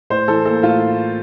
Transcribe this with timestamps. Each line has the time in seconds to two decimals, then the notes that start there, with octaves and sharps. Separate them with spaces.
0.10 A2 C5
0.28 E3 A4
0.45 A#3 A4
0.63 A2 F4